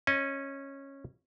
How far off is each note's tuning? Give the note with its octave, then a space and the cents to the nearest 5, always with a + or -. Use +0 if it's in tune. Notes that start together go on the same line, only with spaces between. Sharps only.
C#4 -15 D#5 +5